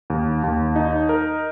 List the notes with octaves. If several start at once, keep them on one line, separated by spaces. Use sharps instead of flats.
D#2
D#2
D#4
A#4